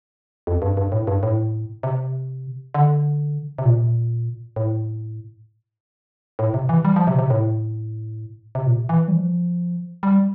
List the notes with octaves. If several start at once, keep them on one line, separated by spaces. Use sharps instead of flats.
F2
G2
G2
A2
G2
A2
C3
D3
C3
A#2
A2
A2
C3
E3
G3
F3
C3
C3
A2
C3
A#2
E3
G3
F3
G3